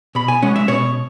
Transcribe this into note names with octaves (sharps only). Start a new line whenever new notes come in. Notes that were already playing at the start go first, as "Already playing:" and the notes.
B2 B5
G#5
G#3 C#4 F#5
E5
B2 C#5